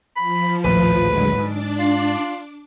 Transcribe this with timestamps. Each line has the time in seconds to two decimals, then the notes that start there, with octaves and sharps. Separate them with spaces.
0.16 F3 B5
0.65 A#1 D#2 A2 B4
1.00 D3 F#3 G#3
1.38 G#2 D4 D5
1.79 F4